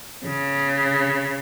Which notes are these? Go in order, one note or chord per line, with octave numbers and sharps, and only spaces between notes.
C#3